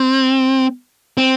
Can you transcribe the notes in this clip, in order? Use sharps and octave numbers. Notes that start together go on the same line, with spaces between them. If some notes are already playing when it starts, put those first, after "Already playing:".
Already playing: C4
C4